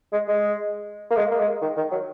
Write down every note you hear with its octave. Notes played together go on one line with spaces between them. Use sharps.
G#3
G#3
A#3
G#3
A#3
G#3
D#3
D#3
F#3